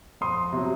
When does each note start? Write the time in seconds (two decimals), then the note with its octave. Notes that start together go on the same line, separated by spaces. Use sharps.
0.21 F2 C6 D#6
0.53 C3 F#3